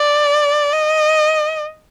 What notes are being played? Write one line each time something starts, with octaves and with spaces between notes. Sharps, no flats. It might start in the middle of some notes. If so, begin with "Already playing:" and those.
Already playing: D5
D#5